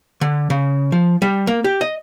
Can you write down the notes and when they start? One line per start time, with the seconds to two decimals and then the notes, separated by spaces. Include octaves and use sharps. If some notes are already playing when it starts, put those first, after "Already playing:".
0.21 D3
0.50 C#3
0.92 F3
1.22 G3
1.47 A#3
1.64 G4
1.81 D#5